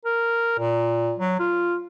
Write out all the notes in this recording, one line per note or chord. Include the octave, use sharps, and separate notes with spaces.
A#4
A#2
F#3
F4